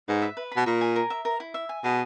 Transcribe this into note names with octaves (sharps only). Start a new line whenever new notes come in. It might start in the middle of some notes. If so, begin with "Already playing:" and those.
G#2 B4
E5
B4
B2 B5
A#2 A#4
G#5
A#4
E5
A#4
E4
E5
G#5
B2 G#4